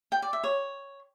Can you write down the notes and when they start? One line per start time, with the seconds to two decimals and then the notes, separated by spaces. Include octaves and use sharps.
0.12 G5
0.22 D5
0.33 E5
0.44 C#5